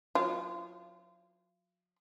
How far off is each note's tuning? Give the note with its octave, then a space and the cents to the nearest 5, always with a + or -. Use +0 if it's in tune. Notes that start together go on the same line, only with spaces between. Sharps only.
F#3 -45 F4 -35